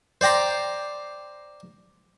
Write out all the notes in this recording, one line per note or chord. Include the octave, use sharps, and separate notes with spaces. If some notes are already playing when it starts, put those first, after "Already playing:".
C5 D5 G5 A#5 C6